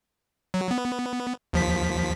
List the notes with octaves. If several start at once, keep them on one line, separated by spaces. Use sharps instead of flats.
F#3
B3
D#2 F3 B6